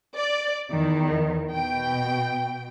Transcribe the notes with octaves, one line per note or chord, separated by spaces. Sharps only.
D5
E2 D#3
B2 G5